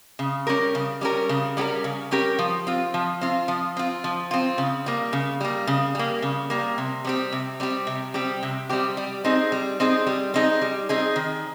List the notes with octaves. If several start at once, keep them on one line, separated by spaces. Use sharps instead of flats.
C#3
G3 C#4 G4 A#4
C#3
G3 C#4 G4 A#4
C#3
G3 C#4 G4 A#4
C#3
G3 C#4 G4 A#4
F3
C4 F4
F3
C4 F4
F3
C4 F4
F3
C4 F4
C#3
G3 A#3
C#3
G3 A#3
C#3
G3 A#3
C#3
G3 A#3
C3
G3 C4 G4
C3
G3 C4 G4
C3
G3 C4 G4
C3
G3 C4 G4
G3
C4 D#4 G#4
G3
C4 D#4 G#4
G3
C4 D#4 G#4
G3
C4 D#4 G#4
D#3